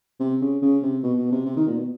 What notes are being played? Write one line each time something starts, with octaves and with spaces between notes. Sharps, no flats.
C3
C#3
C#3
C3
B2
B2
C3
C3
D#3
A#2
B2